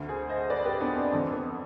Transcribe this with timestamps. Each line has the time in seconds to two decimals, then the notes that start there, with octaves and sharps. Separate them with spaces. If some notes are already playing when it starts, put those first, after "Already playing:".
Already playing: D2 D3
0.09 G#4 C5
0.29 C5 D#5
0.50 B4 D5
0.66 G4 B4
0.81 B3 D4
0.97 C4
1.12 F2 D3 C4
1.33 B3